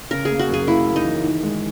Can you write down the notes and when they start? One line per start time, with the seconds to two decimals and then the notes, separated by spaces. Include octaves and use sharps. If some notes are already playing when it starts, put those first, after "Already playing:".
0.11 C#3 A#4
0.25 G#4
0.30 A#3
0.39 F#4
0.49 F#2 G#4
0.67 A#3 E4
0.87 A#3
0.96 D#4
1.05 E3
1.24 D#3
1.43 G#3